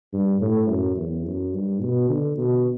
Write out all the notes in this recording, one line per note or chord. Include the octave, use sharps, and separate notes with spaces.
G2
A2
F#2
E2
F#2
G2
B2
D3
B2